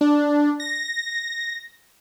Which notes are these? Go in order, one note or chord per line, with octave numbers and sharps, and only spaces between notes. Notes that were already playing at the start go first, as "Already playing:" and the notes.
D4
A#6